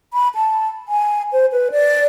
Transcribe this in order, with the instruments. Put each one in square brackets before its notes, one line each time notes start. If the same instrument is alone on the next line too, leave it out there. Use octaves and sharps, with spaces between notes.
[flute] B5
A5
G#5
C5
B4
D5